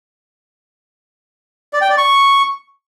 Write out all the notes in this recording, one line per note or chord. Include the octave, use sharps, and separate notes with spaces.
D5
G5
D5
C#6